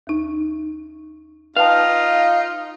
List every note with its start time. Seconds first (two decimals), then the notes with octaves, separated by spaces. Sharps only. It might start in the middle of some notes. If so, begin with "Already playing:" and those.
0.07 D#2 D#4
1.57 D#4 F4 B4 F5 G5 A5